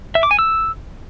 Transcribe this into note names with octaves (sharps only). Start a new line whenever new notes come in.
E5
D6
G#5
E6